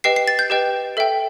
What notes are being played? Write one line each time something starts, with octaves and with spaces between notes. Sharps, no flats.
G4 B4 D#5 G5 C7
C7
A6
G6
G4 B4 D#5 G5
A4 E5 G5